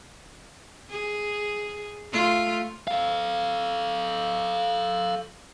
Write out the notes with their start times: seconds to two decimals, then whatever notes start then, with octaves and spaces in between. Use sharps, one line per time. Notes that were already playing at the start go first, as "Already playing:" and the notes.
0.90 G#4
2.12 A3 F4
2.88 A4 F5